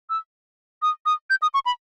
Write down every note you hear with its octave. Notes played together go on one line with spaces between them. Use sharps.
E6
D#6
D#6
G6
D#6
C#6
B5